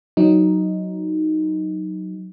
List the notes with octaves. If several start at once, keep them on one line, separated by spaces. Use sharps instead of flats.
F#3 D#4